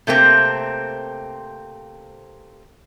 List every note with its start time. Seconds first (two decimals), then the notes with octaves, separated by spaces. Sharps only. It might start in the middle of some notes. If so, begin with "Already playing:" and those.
0.07 C3 A3 A#3 C4